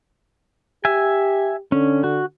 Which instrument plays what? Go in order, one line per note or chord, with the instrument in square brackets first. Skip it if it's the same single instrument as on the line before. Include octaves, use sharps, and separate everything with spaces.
[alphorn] G4 [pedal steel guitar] E5 G#5
[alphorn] D3 [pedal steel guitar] C#4
[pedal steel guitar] F#4